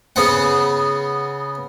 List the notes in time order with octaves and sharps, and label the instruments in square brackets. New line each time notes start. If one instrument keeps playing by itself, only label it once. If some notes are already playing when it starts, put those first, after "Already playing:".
[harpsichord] C#3 B3 F#5